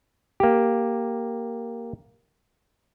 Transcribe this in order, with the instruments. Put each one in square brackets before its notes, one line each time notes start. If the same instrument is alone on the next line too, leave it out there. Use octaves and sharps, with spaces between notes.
[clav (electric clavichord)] A#3 G4